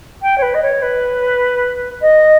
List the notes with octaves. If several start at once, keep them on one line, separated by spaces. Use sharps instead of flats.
G5
C#5
B4
D#5
C#5
B4
D#5